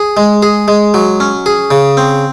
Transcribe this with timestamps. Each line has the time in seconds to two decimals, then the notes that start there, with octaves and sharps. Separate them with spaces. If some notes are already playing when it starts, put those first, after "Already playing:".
Already playing: G#4
0.17 G#3
0.43 G#4
0.68 G#3
0.94 F#3
1.20 C#4
1.46 G#4
1.71 C#3
1.97 C4